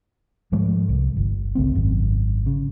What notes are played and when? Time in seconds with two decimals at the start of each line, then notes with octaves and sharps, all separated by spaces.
0.52 G#2 F3 G#3 A3
0.89 C2
1.17 G1
1.55 F#1 C#2 A3 C4
1.74 G#1 F#2
2.46 C#3